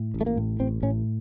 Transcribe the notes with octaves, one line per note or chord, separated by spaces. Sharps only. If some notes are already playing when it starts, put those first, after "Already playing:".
Already playing: A2
A1
A3
A#3
A2
A1 C4
A2 C#4